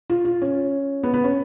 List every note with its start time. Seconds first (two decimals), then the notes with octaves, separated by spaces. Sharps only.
0.10 F4
0.25 F4
0.42 C#4
1.03 B3
1.14 B3
1.24 C#4